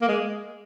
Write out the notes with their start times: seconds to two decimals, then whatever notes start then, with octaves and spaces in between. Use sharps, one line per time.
0.01 A#3
0.08 G#3